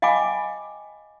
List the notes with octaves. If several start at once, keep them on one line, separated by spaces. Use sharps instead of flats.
D#5 F5 G5 G#5 B5 D6